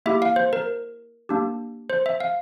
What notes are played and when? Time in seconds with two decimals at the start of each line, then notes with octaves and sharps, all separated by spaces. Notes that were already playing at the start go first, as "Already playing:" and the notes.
0.06 A#3 E4 G4 E5
0.22 F5
0.36 C5
0.53 A#4
1.29 A#3 D4 G4
1.90 C5
2.06 E5
2.20 F5